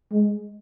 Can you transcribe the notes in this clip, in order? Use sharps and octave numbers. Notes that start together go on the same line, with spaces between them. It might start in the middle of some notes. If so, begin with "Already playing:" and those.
G#3